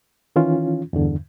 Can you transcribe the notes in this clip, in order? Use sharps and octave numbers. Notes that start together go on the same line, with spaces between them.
D#3 E3 C#4 F4
E2 G2 D3